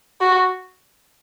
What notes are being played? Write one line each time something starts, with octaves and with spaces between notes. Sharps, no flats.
F#4